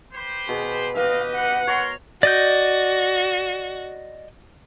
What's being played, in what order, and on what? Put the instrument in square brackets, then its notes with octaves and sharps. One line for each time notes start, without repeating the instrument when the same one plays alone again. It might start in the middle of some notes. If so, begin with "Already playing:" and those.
[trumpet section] G4 B4 C5
[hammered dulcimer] B2 [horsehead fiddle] G#4
[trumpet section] G4 D#5 [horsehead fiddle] B4 [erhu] F5
[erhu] F#5
[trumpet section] A#4 C6 [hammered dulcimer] C#5
[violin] F#4 [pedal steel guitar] D5 D#5 G6